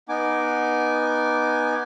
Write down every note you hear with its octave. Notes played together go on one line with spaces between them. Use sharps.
B3 D#4 G#5 D6